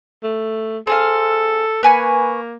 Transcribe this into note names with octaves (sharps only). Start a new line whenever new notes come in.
A3
C4 G#4 A4 F5
A#3 B4 G#5 C#6